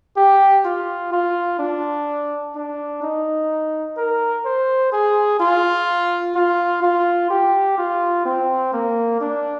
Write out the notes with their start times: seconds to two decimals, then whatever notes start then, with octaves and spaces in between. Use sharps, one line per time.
0.17 G4
0.65 F4
1.12 F4
1.59 D4
2.56 D4
3.03 D#4
3.97 A#4
4.45 C5
4.92 G#4
5.40 F4
6.36 F4
6.83 F4
7.30 G4
7.78 F4
8.25 C4
8.73 A#3
9.21 D4